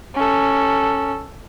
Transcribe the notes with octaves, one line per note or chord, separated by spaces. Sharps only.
C#4 A4